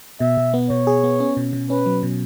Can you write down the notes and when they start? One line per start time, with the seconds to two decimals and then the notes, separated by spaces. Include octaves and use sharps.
0.20 B2 E5
0.37 B2
0.54 B3
0.70 B2 C#5
0.87 G#4
1.04 B3
1.20 C#4
1.37 B2
1.53 B2
1.70 C#4 B4
1.86 F#3
2.03 B2